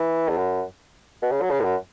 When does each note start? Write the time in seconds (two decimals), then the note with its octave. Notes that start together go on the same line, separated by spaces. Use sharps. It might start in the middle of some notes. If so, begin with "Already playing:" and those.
Already playing: E3
0.29 E2
0.37 F#2
1.22 B2
1.32 C#3
1.41 F#3
1.51 C#3
1.60 A2
1.64 F#2